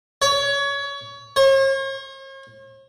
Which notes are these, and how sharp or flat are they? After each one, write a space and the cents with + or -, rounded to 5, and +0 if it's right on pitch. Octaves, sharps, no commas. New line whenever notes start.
C#5 +25
C#5 -45